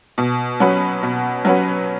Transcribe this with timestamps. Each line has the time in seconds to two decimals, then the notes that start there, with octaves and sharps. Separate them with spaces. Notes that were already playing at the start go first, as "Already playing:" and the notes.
0.18 B2
0.60 F#3 C#4 F#4 B4
1.03 B2
1.45 F#3 C#4 F#4 B4